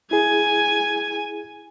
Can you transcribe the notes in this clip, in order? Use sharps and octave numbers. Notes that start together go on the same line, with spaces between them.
E4 G#4 G#5